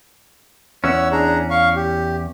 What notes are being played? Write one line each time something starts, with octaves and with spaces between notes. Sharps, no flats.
E2 C#4 C#5 F#5 E6
D4 G#4 A#5
F5 C#6
G4